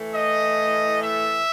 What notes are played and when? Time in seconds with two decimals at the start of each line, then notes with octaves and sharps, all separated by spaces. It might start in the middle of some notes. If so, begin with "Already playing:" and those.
Already playing: A2 E3 A3
0.13 D#5
0.99 E5